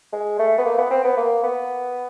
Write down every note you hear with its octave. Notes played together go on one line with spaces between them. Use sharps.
G#3
A3
B3
A#3
B3
C4
B3
A#3
B3